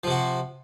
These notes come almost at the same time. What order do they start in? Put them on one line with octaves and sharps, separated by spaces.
F3 C3 F#4